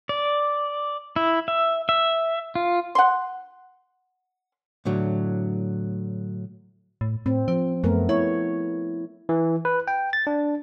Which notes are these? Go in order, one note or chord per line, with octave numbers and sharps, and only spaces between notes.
D5
E4
E5
E5
F4
F#5 C6
A2 D3 F#3
A2
A2 C4
F3 C4
F#2 A3 B3 A#4
E4 C#5
E3
B4
G5
A6
D4